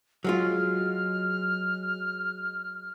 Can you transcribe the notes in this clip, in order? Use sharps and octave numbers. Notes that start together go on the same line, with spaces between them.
F#3 G#3 F4 F6